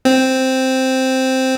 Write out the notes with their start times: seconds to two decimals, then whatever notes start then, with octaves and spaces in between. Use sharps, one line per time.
0.05 C4